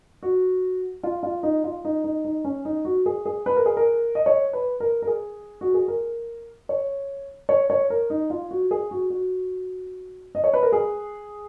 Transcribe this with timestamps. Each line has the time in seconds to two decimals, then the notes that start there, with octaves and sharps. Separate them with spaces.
0.23 F#4
1.03 F4
1.23 F4
1.43 D#4
1.64 F4
1.85 D#4
2.04 D#4
2.25 D#4
2.45 C#4
2.65 D#4
2.85 F#4
3.06 G#4
3.26 G#4
3.46 B4
3.56 A#4
3.66 G#4
3.77 A#4
4.15 D#5
4.26 C#5
4.53 B4
4.80 A#4
5.02 A#4
5.07 G#4
5.61 F#4
5.74 G#4
5.88 A#4
6.69 C#5
7.49 C#5
7.70 C#5
7.90 A#4
8.10 D#4
8.30 F4
8.51 F#4
8.71 G#4
8.91 F#4
9.10 F#4
10.35 D#5
10.44 C#5
10.54 B4
10.63 A#4
10.72 G#4